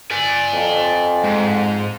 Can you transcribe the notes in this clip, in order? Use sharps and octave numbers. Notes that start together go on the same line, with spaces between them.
D5 G#5
F2
G#2